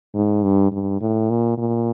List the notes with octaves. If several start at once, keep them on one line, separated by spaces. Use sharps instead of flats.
G#2
G2
G2
A2
A#2
A#2